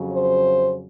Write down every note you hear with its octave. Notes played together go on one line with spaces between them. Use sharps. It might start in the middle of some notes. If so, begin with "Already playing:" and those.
Already playing: F2 C#3 F#3
C5